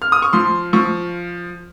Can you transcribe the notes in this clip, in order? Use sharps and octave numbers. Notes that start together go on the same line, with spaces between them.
F6
D#6
C#6
F3 C6
F3 C#6